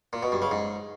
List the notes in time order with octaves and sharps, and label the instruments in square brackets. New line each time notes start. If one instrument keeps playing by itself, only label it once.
[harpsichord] A#2
B2
G2
C#3
G#2